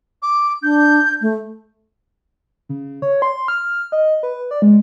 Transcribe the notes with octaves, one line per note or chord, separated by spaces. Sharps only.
D6
D4 G6
A3
C#3
C#5
C6
F6
D#5
B4
D5
G#3